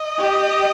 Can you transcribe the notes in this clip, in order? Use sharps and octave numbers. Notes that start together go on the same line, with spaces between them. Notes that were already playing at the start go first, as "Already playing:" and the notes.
Already playing: D#5
G4